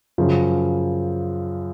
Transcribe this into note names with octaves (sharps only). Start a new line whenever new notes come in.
F#2 C#3 F3